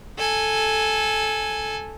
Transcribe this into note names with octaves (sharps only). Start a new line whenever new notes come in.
A4 G#5